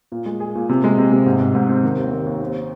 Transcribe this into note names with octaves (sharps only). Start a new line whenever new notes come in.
A#2
G#3
G#4
A#2
C3
G#3
C3
C3
G#2
G#2
G#2
C4
D#3
D#2
D#3
D#2
C4